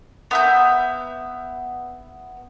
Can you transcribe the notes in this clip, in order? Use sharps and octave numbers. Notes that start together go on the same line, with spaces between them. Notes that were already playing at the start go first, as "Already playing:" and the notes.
B3 E5 G6